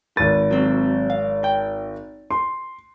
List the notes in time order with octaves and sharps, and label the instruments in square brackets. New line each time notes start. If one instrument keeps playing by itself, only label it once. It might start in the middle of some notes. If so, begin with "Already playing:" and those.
[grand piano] G#1 A6 [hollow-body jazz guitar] B4
[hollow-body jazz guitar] F#3 C4
F5
G5
[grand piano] C6